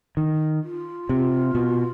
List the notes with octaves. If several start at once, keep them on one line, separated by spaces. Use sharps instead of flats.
D#3
F4
C3
B2